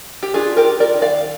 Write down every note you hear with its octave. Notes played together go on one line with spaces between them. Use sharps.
G4
D4 F4 G#4
G4 A#4
F4
A#4 D5
D#3
D5 F5